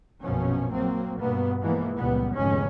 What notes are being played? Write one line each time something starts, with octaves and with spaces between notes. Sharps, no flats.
A#1 F#2 B2 F3 C#4
F#3 A#3 C4
G2 B2 A#3 B3
B2 E3 F3 G#3 A#3 B3
C#2 A#2 E3 G3 B3
F1 E2 G#2 D3 G#3 C#4